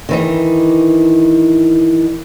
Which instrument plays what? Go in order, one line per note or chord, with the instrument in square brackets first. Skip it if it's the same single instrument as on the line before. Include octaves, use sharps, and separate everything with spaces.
[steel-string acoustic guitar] D#3 E3 D#4